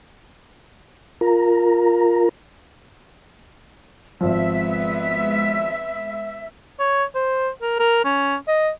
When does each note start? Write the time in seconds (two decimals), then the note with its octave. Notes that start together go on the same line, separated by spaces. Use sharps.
1.21 F4 A#4 A#5
4.21 G#1 F3 G#3 B3 E5 E6 B6
6.79 C#5
7.15 C5
7.62 A#4
7.79 A#4
8.05 C#4
8.48 D#5